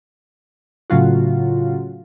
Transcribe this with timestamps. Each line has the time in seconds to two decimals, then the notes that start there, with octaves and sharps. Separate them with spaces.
0.90 A2 C#3 F#3 F4 F#4